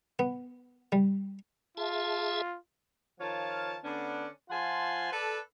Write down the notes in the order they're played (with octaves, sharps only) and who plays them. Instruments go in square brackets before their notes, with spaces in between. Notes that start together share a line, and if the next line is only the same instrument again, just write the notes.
[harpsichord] B3
G3
[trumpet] F4 [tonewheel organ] G#4 E5 A5
[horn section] D#3 F3 F4 C#5 F5 A5
D3 B3 C#4 D4
F3 F4 F#5 G#5 A5 C6
A4 B4 D5